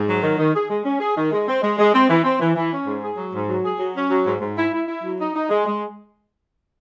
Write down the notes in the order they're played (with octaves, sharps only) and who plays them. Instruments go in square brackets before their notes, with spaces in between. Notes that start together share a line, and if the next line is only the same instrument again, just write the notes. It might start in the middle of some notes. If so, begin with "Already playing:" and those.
Already playing: [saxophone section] G#2
F#3
D#3
D#3
G#4
G#3
C#4
G#4
D#3
G#3
C4
G#3
G#3
C4
E3
C4
E3
E3
C#4
G#2
G#4
F#3
G#2
F#3
G#4
F#3
C#4
F#3
G#2
G#2
E4
E4
E4
F#3
D#4
D#4
G#3
G#3